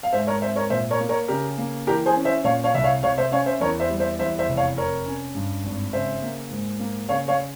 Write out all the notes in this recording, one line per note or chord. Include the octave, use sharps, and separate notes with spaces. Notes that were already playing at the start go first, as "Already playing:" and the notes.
F5
G#2 C5 E5
A#4 C#5
C4 C5 E5
A#4 C#5
A#2 C5 E5
A#4 C#5
A#3
A#4 C#5
C#3 G4 A#4
A#3
E3 G4 A#4
G#4 C5
C#4
C5 E5
A#2 C#5 F5
C#5 F5
C2 E5
C#5 F5
C3 C#5 F5
C5 E5
C#4 C#5 F5
C5 E5
E2 A#4 C#5
C5 E5
G3
C5 E5
E2 C5 E5
C5 E5
F1
C#5 F5
C3 A#4 C#5
C#4
G2
G#1
C#3 C5 E5
A#3
G#2
A#3
C#3 C#5 F5
C#5 F5